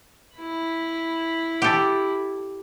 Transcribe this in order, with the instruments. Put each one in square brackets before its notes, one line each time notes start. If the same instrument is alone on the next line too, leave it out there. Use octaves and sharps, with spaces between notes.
[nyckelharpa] E4 B5
[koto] G4 A4